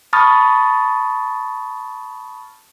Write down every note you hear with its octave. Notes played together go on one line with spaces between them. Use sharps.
A5 B5 C#6 D#6 F6 A6